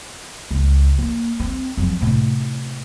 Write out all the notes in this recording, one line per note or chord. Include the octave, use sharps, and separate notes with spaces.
C#2
A#3
C4
F2 F#3
A2 C3